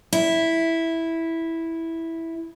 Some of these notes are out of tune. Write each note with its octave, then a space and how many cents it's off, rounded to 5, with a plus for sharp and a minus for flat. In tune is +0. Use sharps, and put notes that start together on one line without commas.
E4 -5